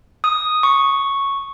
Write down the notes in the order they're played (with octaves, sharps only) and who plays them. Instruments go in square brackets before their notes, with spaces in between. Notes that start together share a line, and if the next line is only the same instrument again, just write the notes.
[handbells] D#6
C#6